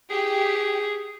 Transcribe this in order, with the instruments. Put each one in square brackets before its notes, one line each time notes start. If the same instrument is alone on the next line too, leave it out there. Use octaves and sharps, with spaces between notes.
[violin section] G4 [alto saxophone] G#4